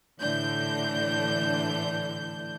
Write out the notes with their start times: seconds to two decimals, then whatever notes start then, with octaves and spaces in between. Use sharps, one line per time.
0.20 A2 D3 E3 D4 G6